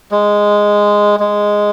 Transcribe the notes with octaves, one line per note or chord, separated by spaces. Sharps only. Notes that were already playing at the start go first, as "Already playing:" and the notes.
G#3
G#3